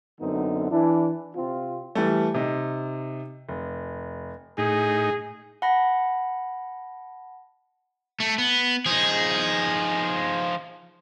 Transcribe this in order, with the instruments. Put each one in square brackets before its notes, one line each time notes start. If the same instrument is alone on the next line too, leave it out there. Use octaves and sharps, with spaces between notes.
[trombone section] F#2 D3 B3 C4 D#4
E3 D4 E4
C3 C4 F4
[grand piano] E3 G3 A3
C3 D#4
F1
[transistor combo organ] A2 D#4 [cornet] G#4
[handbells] F#5 A5 B5 A#6
[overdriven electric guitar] A3
B3
[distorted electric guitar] F3 D#4 [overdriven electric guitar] G#4